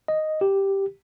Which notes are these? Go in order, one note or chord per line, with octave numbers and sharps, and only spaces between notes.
D#5
G4